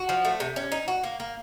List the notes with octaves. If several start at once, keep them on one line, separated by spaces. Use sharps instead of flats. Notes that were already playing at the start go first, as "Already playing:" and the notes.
Already playing: F#4
F3
A3
C3
C#4
D#4
F#4
A#3
A#3